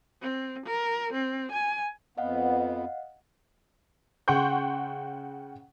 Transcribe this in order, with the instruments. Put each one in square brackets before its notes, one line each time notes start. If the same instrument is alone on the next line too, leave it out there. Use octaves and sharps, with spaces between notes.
[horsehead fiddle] C4
A#4
C4
G#5
[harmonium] F2 B3 [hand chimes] D#5 F5 F#5
[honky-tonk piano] C#3 F#5 G5 C6 C#6 G6